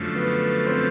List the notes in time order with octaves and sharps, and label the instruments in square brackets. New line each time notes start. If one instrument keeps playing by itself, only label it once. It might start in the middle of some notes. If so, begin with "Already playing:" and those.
Already playing: [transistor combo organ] F#2 D3 F3 A3
[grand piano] B3
C4